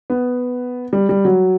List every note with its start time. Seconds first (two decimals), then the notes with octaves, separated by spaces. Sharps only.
0.10 B3
0.93 G3
1.09 G3
1.25 F#3